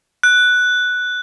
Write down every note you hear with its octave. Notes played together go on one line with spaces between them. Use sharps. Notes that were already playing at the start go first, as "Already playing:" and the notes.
F#6